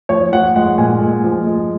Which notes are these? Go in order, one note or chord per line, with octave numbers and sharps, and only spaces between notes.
F3 C#5
F3 F#5
G#3 F#5
A#2 G#5
G#3
F3
G#3